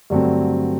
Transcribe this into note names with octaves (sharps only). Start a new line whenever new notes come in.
G2 D3 F#3 A3 C4